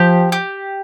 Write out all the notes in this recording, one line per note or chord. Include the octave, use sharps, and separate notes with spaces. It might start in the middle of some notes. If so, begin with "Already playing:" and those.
Already playing: F3 G4
G4